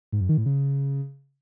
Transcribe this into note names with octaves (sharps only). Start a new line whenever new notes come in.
G#2
F#2
D#3
A2
C#3